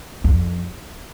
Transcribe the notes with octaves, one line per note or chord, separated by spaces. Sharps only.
F2